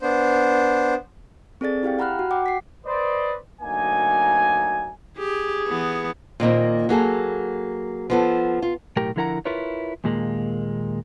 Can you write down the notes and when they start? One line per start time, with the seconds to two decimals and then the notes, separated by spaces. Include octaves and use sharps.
0.01 B3 D4 C5
1.61 C4 G#4 A4 D5 A6
1.83 E4 G4 F5 G5
1.99 F#5 A#5 B5 F6 F#6
2.19 F#4
2.31 F#5 G5 D6
2.46 B6 C7
2.87 B4 C5 D5 D#5
3.61 D2 F#3 A#3 D#4 G#5
5.18 G4 G#4
5.69 E3 B3
6.40 A#2 D#3 A#3 C4
6.89 F#3 A#3 G#4 A4
8.10 F3 B3 A4
8.62 F4
8.97 B1 A2 G4 A#4 G5
9.16 D3 F3 E4 A#4 F#5 A#5
9.45 E4 F4 A#4 B4 C#5
10.04 D#2 A#2 G#3 A#3